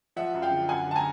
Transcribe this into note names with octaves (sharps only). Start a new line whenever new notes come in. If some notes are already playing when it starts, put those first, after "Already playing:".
F3 E5 F#5
F#2
F5 G5
D3
F#2 F#5 G#5
D3 A5
G#5 A#5